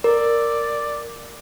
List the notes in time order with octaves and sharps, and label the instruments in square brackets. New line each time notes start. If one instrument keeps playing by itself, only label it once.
[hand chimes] A#4 [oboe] D5